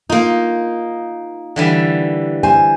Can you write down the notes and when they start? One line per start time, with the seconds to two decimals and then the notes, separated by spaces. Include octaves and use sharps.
0.09 A#3 D#4 F4
1.56 D3 E3 G3
2.43 C5 G#5